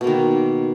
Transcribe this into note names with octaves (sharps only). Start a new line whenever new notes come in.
B2 D#3 A#3